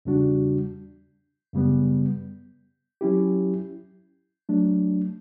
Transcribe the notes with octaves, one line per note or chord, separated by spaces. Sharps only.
E2 C#3 G3 D4 F#4
F#2 C#3 G3 B3
F#3 C#4 E4 G4
F#3 A3 D4